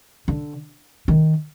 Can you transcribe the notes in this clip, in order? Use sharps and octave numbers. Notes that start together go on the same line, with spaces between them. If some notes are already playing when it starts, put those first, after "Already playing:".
D3
D#3